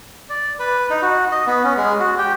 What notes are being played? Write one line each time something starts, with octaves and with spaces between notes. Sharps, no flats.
D5
B4
D#4
F#4
D#5
B3
C#4
G#3
F#4
G4